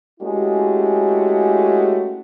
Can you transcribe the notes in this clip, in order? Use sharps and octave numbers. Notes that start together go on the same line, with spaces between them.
G#3 A3 C#4 E4 F#4 G4